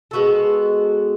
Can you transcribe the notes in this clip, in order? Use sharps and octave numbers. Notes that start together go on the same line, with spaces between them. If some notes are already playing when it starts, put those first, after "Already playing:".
G#3 B3 F#4 A4